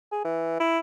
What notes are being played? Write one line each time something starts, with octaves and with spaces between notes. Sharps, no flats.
G#4
E3
E4